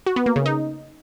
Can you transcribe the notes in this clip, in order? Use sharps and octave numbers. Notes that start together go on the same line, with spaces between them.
F#4
B3
A#3
C#3
D#4